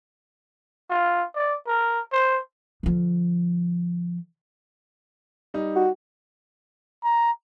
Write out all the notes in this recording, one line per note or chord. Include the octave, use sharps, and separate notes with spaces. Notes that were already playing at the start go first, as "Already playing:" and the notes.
F4
D5
A#4
C5
D3 F3
G3 D#4
F#4
A#5